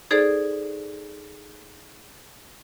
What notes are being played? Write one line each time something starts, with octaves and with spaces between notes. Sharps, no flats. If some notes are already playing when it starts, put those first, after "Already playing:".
D#4 G#4 A4 C5 D5